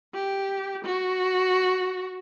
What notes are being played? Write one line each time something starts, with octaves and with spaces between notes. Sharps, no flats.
G4
F#4